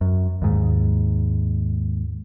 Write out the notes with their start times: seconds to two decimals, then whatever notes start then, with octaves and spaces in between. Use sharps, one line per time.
0.01 F#2
0.42 D#2 G#2